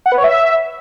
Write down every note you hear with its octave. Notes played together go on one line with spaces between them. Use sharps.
F#5
B4
C#5
E5